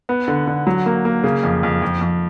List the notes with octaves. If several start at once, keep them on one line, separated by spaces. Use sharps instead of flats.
B3
D3
D3
F#3
A#3
A#3
C#3
F2
F2
F2
F2